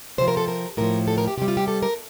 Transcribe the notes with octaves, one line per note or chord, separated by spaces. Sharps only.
C3 F3 C5
A#4
A4
A#4
A2 F3 A#4
A4
A#4
G4
C3 G3 G4
F4
G4
A4
A#4